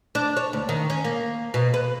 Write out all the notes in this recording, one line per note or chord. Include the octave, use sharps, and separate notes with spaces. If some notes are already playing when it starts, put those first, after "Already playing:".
D4
C#5
D2
D#3
C#4
A#3
B2
B4